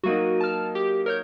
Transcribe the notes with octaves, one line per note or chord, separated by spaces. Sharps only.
F#3 A#3 D#4 F#4 D#7
A5 F6
G4
A#4 C#5 G6